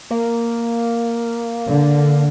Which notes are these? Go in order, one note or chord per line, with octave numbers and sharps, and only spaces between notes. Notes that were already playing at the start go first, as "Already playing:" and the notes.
A#3
D3